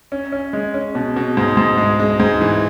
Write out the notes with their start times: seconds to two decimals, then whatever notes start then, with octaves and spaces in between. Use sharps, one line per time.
0.12 C#4
0.32 C#4
0.53 G#3
0.74 C#4
0.95 B2
1.16 B2
1.37 G#2
1.57 G#2
1.78 G#3
1.99 G#3
2.20 G#2
2.41 E3